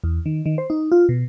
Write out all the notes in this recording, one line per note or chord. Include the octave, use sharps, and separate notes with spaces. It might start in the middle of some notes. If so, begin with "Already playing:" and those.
E2
D#3
D#3
C5
D#4
F4
B2